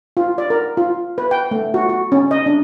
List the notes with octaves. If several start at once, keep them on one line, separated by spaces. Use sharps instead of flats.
F4
D5
A#4
F4
B4
G5
A3
F#4
F#4
C#4
D#5
D4